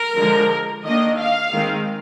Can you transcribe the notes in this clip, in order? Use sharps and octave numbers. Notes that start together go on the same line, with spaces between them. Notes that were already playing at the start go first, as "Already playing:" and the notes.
Already playing: A#4
D3 F3 G#3
D#3 A#3 D4 D#5
F5
D#3 G#3 C4